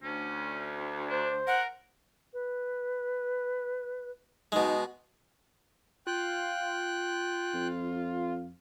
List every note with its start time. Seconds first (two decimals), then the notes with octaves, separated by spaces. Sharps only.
0.03 D2 C#4
1.10 D4 C5
1.47 A#4 F#5
2.33 B4
4.52 B2 G#3 D#4
6.07 F4 G5 F#6
7.54 F2